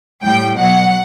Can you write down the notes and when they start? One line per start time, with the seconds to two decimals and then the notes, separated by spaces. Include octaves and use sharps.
0.25 A2 G3 G5
0.58 B2 F#3 F#5